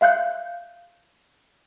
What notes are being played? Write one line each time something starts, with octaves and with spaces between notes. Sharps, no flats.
E5 F5 F#6 G6